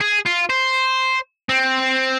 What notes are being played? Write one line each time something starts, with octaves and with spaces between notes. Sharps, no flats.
G#4
F4
C5
C4